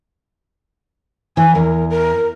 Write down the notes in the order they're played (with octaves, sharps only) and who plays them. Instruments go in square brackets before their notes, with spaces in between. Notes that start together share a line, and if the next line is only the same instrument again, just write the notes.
[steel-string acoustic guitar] E3 [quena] G#5
[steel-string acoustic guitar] E2 [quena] A#4
[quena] A#4